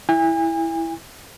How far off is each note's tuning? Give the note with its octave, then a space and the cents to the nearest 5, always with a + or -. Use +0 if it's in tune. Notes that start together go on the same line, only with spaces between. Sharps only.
E4 +0 G#5 -40